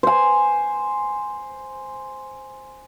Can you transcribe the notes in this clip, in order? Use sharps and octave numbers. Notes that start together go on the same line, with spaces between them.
C5 G#5